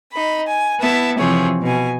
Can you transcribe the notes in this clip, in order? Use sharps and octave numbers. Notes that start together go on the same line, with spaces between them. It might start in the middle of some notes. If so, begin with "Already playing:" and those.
D#4 B5
G#5
B3 E4 E5 A5
C3 E3 F3 C4 G#4 C#5
B2 G#5